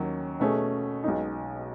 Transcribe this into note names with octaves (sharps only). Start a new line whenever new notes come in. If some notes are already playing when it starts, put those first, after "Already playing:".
Already playing: D#2 D#3 F#3 C#4
B2 A3 C#4 G#4
B1 B2 G#3 D#4